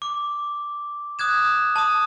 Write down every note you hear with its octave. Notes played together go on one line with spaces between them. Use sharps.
D6
D#6 F#6 G#6 E7
A5 D#6